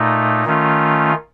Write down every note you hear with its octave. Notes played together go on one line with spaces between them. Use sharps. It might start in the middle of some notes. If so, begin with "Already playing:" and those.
Already playing: A#2 A3 D#4
D#3 A3 C#4 F4